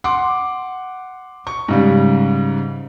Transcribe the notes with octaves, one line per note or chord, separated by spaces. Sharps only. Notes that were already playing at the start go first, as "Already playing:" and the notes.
F#5 C6 D6
C#6
G#2 C#3 G3